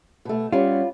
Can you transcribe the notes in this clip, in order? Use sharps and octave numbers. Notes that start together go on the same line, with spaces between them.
B2 A3
G3 B3 C#4 F4